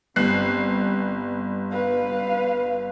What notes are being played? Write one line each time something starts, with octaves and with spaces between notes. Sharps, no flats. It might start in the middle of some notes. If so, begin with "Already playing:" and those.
G1 C4 F#6 C7
B4 F5